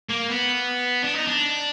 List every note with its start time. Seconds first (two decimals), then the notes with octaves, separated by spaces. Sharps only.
0.10 A#3
0.29 B3
1.04 D4
1.15 D#4
1.27 D4